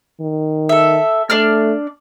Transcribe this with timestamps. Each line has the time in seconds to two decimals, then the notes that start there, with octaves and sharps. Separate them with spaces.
0.21 D#3
0.69 A4 E5
1.30 A3 D4 D5 F6